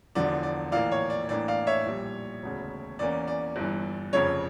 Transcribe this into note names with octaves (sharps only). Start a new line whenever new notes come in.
E1 E2 D3 F3 D5
D5
A#1 A2 E3 A#3 D5 F5
C#5
D5
A1 A2 E3 A#3 D4 D5
D5 F5
C#5 E5
A#1 A#2 G3
E1 D2 C#3
E2 E3 A#3 C#4 D5
D5
G1 G2 E3
F1 F2 C#3 C#5